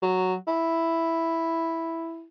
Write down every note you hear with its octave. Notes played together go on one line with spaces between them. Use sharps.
F#3
E4